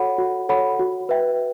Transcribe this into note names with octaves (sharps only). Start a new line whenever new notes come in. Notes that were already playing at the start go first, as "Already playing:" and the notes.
Already playing: F#4 A4 C#5 F#5 B5
F#4
A4 C#5 F#5 B5
F#4
B4 E5 G5